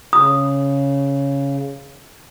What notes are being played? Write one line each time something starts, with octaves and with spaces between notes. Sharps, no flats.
C#3 D#6